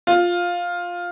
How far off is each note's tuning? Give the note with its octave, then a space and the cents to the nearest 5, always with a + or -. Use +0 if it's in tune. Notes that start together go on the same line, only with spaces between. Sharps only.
F4 +10